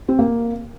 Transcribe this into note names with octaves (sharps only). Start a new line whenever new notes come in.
C4
A#3